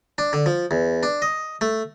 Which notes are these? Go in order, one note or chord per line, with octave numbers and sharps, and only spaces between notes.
D4
D3
F3
E2
D4
D#5
A3